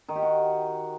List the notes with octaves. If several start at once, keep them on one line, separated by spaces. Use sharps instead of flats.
D#3
G4
F#4